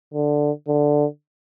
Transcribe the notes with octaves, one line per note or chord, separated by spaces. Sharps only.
D3
D3